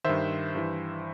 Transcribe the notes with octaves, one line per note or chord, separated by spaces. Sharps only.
G2 D#3 C5 E5
G2 E3